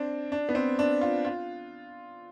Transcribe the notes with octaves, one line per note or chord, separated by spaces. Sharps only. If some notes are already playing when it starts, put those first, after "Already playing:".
Already playing: C4 D4
D4
B3
C4
D4
F4
F4